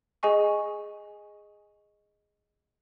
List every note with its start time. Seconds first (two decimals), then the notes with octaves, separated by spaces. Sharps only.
0.23 G#4 D#5 G#5 C#6